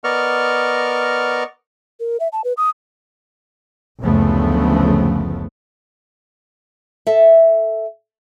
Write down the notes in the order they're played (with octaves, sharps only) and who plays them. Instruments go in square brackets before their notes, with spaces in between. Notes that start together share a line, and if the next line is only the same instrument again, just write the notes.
[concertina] B3 A#4 D5 D#5 C#6 F6
[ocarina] A#4
E5
A5
B4
D#6
[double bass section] F#1 D2 C#3 F3 A3 B3
[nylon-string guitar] A4 E5